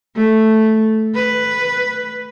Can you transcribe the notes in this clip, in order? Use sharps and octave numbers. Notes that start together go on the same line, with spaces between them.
A3
B4